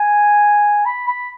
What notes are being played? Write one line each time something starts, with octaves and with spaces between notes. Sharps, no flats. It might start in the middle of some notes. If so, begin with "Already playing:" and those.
Already playing: G#5
B5
B5